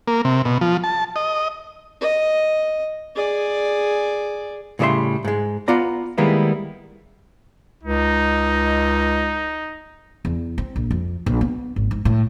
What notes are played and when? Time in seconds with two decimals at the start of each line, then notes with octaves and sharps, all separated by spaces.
0.08 A#3
0.25 C3
0.45 B2
0.61 F3
0.84 A5
1.16 D#5
2.01 D#5
3.15 G#4 D5
4.79 A2 C#3 G3 C#5 E5 C6
5.25 G#2 G#3
5.68 B3 F4 D5 A#5
6.18 D#3 G3 G#3 A#3 B3 E4
7.84 C#2 D#4
10.25 E2
10.58 C4
10.76 A#1
10.91 F2
11.26 A#1
11.41 B3
11.76 G#1
11.91 G#2
12.05 A2